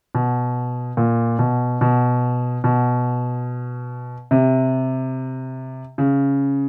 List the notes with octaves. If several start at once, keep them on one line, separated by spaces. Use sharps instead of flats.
B2
A#2
B2
B2
B2
C3
C#3